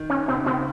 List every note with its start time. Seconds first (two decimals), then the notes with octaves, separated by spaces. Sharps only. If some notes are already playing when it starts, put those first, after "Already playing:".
Already playing: D#3
0.10 C#4
0.28 C#3 C4
0.37 D#3
0.46 C#3 C4